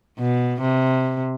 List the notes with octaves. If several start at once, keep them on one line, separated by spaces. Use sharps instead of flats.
B2
C3